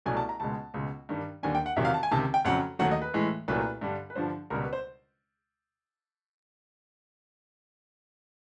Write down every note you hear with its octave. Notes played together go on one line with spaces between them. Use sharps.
C2 B2 F#3 A3 G#5
A5
A#5
C#2 B2 G#3 A5
C#2 B2 G#3
G2 D#3 G3
D#2 D3 G3 G#5
G5
F#5
E2 C3 D#3 F#3 E5
F5
A5
G#5
C#2 C3 D#3 A5
G5
F2 C#3 F#3 F#5
D#2 D#3 F#3 A3 F#5
D#5
B4
A2 E3 G#3
C2 A#2 F#3 A3 B4
G2 D3 G3
B4
G2 D3 F3 C5
C#2 B2 G3 A#4
B4
C5